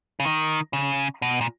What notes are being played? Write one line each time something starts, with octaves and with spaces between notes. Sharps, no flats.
C#3
D#3
C#3
B2
A#2